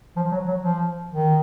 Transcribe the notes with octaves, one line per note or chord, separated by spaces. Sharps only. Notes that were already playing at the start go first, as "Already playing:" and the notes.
F3
F#3
F#3
F3
D#3